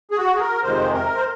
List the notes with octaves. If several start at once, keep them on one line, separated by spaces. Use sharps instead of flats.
G#4
F#4
G#4
A#4
F2 C3 D#3 G#3 C5
A#4
C5